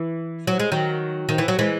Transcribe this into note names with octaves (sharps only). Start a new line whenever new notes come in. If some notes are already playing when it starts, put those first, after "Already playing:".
Already playing: E3
F#3
G#3
D#3 F#3
D#3
E3
F#3
E3 G#3